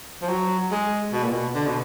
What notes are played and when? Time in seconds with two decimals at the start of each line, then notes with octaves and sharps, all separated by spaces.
0.22 F3
0.29 F#3
0.72 G#3
1.12 B2
1.23 A#2
1.32 B2
1.55 D3
1.67 B2